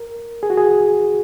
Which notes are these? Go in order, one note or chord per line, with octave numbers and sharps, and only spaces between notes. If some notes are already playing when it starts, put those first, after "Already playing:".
Already playing: A#4
G#4
F#4
G#4